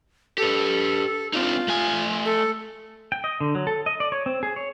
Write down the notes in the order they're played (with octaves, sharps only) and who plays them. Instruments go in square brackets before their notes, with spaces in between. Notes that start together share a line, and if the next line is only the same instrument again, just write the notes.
[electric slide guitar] G4 B4 [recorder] A4
[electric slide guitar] C4 D4 D#4 [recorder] F4
[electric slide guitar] A3 G#5
[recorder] A4
[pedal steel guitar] G5
D#5
D3
F#3
A4
D#5
D5
C#5
C4
G#4
C#5